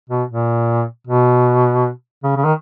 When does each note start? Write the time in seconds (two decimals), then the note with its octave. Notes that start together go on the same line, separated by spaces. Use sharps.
0.09 B2
0.29 A#2
1.07 B2
2.23 C#3
2.36 C#3
2.45 D#3